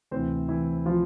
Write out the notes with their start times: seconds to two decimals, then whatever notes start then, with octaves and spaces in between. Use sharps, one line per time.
0.11 D2 C3 E3 C4 C5
0.49 E3 E4
0.86 F3 F4